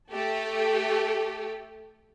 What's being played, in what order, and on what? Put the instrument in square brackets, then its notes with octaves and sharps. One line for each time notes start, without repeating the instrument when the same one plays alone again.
[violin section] A3 G4 A4